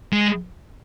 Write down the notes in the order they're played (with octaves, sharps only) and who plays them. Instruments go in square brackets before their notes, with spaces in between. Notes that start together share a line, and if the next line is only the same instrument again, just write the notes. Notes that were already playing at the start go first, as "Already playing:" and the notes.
[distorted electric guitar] G#3